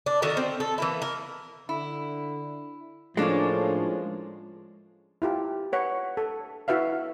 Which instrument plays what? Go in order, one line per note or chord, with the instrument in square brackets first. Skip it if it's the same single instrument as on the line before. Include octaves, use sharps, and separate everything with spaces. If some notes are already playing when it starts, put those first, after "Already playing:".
[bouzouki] D4
D#3 A3 F#4 A#4
C4
A4
E3 A#3 E4
A#4
[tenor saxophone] D3 [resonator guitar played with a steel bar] E4
[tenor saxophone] A2 [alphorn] F3 [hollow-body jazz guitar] G#3 C#4 [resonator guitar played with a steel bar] A#3 D4 F4
[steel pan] E4 F4 G4
B4 C#5 F#5
A4
E4 F#4 B4 E5 F5